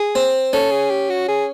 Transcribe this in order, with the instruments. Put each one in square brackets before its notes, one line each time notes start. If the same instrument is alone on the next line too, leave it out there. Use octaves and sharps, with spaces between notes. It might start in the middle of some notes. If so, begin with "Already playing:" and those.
Already playing: [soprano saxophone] G#4
[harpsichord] C4
[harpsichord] C#4 [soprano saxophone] A4
[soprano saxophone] G#4
G4
F#4
G#4